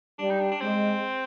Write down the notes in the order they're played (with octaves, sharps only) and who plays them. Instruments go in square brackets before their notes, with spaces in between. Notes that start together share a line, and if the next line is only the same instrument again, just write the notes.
[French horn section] G3 [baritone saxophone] D4
[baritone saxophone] D#4
D4
D4
[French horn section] G#3 [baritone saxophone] C4